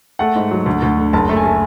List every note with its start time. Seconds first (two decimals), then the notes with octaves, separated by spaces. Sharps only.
0.19 A3 F#5
0.36 G#2
0.51 F#3
0.66 D2
0.82 D2
0.98 D3
1.13 F#1 A5
1.29 A3
1.37 G#5
1.44 A3